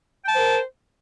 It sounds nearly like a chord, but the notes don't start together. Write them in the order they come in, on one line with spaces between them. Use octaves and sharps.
G5 A5 C5 A#4